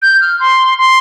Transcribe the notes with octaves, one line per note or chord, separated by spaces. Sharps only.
G6
F6
C6
C6